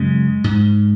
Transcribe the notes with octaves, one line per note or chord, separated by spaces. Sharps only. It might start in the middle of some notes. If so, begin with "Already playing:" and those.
Already playing: F#2 C#3 G#3
G#2